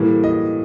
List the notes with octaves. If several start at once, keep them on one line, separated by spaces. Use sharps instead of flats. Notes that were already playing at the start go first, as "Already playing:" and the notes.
Already playing: A2 E3 G3 A#3
D#5